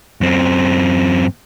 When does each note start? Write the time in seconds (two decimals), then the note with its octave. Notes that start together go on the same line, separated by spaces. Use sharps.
0.21 F#2 C4